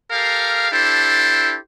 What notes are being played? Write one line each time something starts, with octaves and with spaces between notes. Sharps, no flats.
G4 A4 A#4 F5
D4 E4 G4 A4 C5